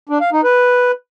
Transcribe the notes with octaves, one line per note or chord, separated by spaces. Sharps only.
D4
F5
D#4
B4